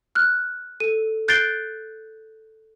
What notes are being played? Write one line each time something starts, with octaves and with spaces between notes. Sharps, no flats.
F6 F#6
A4 D#7
F#6 G6 A6 C7 D7 G7